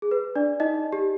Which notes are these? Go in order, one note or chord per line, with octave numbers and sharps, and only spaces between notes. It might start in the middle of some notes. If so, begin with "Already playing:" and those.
G#4
B4
D4 D5
D#4 D#5
G4